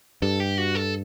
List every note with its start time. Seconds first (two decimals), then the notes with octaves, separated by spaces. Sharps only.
0.22 G2 A4
0.40 G4
0.58 F#4
0.75 A4